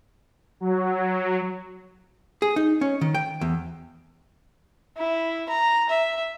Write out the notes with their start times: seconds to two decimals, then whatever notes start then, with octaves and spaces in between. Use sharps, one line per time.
0.60 F#3
2.42 G#4
2.56 D#4
2.81 C#4
3.01 D#3
3.15 G5
3.41 E2
4.98 E4
5.49 A#5
5.90 E5